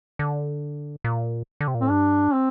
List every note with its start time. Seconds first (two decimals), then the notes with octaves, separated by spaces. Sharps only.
0.19 D3
1.04 A#2
1.61 D3
1.68 C3
1.75 A#2
1.81 A2 C4
1.90 G2 D4
2.33 C4